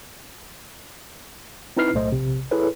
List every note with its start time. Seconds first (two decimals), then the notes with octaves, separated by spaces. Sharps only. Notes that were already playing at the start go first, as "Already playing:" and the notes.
1.77 C4 D#4 E4 B4 F6 C7
1.94 B1 A2 A3 C5 D#5
2.12 A#1 C3
2.51 E4 G#4 A4 B4 C#5